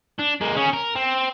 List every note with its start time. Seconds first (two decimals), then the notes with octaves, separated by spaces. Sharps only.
0.19 D4
0.41 G#3 A#3
0.57 C#4 G#4
0.73 A#4
0.95 C4